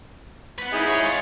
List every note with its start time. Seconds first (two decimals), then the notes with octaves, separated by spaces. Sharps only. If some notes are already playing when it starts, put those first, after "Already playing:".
0.58 B4 F#5
0.73 D#4 E4 G#4
0.88 C#5
1.03 F4 C#5